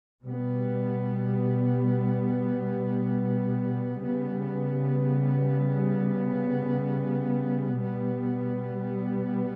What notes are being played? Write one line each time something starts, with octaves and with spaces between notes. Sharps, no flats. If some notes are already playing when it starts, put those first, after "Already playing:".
B2 G3 B3
C#3 G3 B3
B2 G3 B3